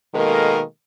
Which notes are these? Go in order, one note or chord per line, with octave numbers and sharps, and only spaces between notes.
B2 D#3 G#3 A#3 A4 A#4